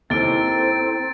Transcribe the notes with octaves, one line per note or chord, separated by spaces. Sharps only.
D#2 C4 E4 A4 A#5 A6 D7